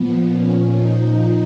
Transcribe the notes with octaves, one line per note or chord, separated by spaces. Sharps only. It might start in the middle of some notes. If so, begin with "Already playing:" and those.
Already playing: A#2 F3 B3
A#2 F3 C#4
A#2 F3 D#4